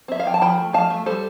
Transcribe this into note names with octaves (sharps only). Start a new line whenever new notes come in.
C4 E5
F5
F3 G5
A5
F3 G5 B5
A3
F3 F5 A5
A3
G3 A4 C5